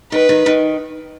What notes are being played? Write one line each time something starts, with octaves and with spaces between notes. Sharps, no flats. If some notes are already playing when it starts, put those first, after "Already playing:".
D#3 B4
D#3
D#3